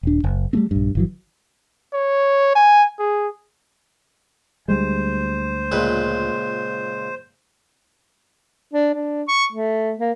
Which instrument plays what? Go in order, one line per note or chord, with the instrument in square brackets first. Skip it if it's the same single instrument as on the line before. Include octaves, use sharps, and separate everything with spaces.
[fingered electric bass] D#1 D4
F#1
G3 A3 C4
A#1 G2
G1 E3 F#3
[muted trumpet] C#5
G#5
G#4
[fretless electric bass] D2 G3 G#3 [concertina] C5
[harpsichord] C#2 A#2 B4
[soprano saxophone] D4
D4
C#6
A3
A#3